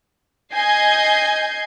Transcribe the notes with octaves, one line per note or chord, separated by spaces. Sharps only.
D#5 G#5 G6 G#6 C7